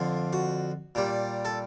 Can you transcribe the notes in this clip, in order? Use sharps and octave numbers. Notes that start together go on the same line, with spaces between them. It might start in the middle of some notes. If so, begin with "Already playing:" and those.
Already playing: F2 D3 F3
F#4
A#2 G3
A4